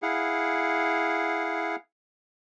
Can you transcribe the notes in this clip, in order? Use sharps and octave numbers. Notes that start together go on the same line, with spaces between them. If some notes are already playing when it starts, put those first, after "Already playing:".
E4 G#4 F5 F#5